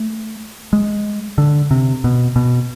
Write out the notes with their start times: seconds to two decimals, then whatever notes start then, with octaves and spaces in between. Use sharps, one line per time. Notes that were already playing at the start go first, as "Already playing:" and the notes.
Already playing: A3
0.73 G#3
1.38 D3
1.71 C3
2.04 B2
2.36 B2